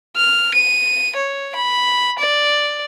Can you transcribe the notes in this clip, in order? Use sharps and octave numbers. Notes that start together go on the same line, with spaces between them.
F6
D#7
C#5
B5
D5